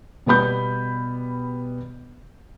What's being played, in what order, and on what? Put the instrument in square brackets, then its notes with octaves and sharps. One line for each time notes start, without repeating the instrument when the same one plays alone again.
[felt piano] B2 G3 B3 B5 G6